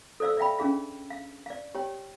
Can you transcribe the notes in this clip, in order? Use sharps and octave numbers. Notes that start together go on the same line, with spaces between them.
A4 C5 D5 F5 E6
D5 E5 F5 G5 B5
C#4 D4 G#4 F5
F5
D5 F5
G4 C#5 G5